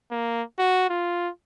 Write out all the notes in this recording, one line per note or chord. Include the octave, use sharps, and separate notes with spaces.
A#3
F#4
F4